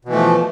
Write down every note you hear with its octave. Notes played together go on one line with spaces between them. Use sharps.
B2 E3 F3 A3